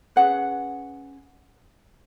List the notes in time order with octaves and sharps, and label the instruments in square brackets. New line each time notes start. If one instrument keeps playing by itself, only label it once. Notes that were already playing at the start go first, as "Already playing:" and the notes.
[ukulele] C#4 G#4 B4 F#5